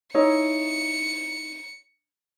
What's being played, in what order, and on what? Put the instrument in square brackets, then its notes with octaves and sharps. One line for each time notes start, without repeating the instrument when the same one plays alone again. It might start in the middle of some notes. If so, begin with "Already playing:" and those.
[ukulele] D#4 E4 C#5 [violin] C#7